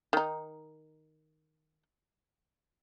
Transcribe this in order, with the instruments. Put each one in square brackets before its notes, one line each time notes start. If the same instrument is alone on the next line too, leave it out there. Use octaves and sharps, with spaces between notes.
[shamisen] D#3 D#4